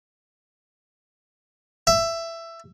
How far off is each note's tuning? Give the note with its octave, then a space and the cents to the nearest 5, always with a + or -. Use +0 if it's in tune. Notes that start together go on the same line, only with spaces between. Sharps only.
E5 +15